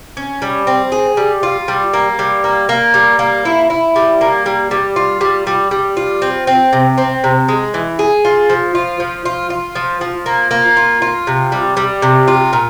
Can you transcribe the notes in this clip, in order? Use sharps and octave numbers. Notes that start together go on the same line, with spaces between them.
C#4
G3
C4
G#4
G3
F4
G3
A#3
G3
A#3
A#3
G3
A#3
E4
E4
G3
A#3
G3
G3
F4
G3
G3
G3
F4
C4
C4
C3
C4
C3
G#3
E3
G#4
F4
F3
F4
F3
F4
F4
F3
F3
A#3
A#3
F4
F4
C3
G3
G3
C3
F4
A#2